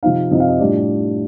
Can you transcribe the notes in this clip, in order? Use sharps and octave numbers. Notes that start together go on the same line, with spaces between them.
C3 F3 C4 D#4 F5
C3 F3 C4 D#4 D#5
F5
D#5
A2 G3 D4 F4 D5